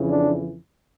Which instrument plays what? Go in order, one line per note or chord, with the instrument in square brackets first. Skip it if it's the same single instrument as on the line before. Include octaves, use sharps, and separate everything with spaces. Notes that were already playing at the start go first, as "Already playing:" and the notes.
Already playing: [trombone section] F2 C#3 E3
D4